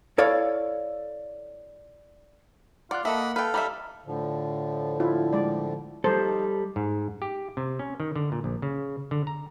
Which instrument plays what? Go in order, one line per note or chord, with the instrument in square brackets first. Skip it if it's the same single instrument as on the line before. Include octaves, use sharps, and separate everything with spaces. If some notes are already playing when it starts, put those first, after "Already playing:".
[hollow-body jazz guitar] E4 A4 C#5 D5 F5
[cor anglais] F4 [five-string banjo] D5 [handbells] F#5 F#6
[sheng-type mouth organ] A#3 F#5 B5 [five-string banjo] A4 [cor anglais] D#5 [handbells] E5 A5
[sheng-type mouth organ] A4 [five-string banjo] B4 G5 [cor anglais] F5
[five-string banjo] G3 D#4 E5 [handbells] A#5 B5
[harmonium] A2 D3 F3
[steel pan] E4 F4
G#3 D5
[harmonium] F3 D#4 [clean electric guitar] G3 A4 [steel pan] C5
[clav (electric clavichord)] G#2
G4
C3
C#4
D#3
D3
A#2
A#1
C#3
D3
A#5